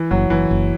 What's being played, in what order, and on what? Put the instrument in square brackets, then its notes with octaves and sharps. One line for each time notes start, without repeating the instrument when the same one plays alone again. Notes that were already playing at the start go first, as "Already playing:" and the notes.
Already playing: [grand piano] E3
[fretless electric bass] F#1 [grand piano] F#3
[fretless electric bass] F#1 [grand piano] E3
[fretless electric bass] F#1